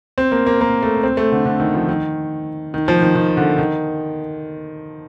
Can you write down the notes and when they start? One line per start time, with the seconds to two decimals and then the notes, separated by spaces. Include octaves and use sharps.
0.18 C4
0.32 A#3
0.47 A#3
0.61 A#3
0.83 A3
1.03 C4
1.17 A3
1.32 D3
1.45 D3
1.60 D#3
1.74 F3
1.89 D#3
2.74 D#3
2.88 F3
3.02 D#3
3.15 D#3
3.37 D3
3.58 D#3